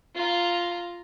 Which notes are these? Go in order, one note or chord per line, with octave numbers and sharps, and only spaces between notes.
F4 A#5